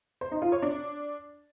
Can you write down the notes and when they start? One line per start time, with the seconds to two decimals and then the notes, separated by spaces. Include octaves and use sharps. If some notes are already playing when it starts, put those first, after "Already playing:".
0.21 C5
0.32 D#4
0.42 F4
0.52 C#5
0.62 D4